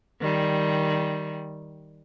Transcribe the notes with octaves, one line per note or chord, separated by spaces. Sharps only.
D#3 G3